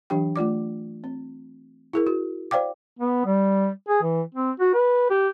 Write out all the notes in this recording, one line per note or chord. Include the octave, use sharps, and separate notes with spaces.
E3 F#3 D4 G4 G5
A3 F4 D5 D6
C4
E4 G#4 A#4
F#4
C5 D5 F5 G5 D6
B3
G3
G#4
E3
C4
F#4
B4
G4